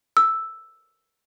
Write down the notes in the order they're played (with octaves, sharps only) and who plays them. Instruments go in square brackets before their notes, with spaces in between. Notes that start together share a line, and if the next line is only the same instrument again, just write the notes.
[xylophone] E6